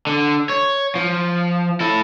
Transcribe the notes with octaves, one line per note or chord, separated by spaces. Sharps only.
D3
C#5
F3
E4 A4